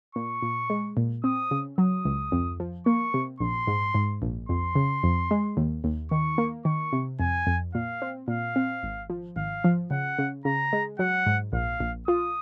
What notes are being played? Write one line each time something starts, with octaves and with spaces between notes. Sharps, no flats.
A#2 C#6
A#2
G#3
A#2
C4 D#6
C#3
F#3 D#6
C#2
F2
F3
A#3 C#6
C3
A#1 C6
G#2
G#2
A#1
F2 C6
C#3
F2
G#3
D#2
D#2
D#3 C#6
A#3
D#3 C#6
C3
F2 G#5
F2
A#2 F5
C4
A#2 F5
C4
G#1
F3
G#1 F5
F3
C#3 F#5
C#3
C#3 A#5
G#3
F#3 F#5
G#2
A#1 F5
A#1
F4 D#6